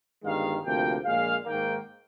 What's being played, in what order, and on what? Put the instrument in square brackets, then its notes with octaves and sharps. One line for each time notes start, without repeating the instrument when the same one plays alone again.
[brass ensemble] G1 G2 D#3 G#3 F5
D2 C3 F3 A#3 G5
A#1 A#2 G#3 F5
G#2 D#3 A#3 G5